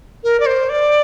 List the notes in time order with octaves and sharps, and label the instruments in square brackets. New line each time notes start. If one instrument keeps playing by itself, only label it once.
[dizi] A#4
D5
C5
D5